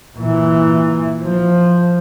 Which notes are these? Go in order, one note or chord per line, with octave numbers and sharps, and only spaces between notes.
A#2 E3
F3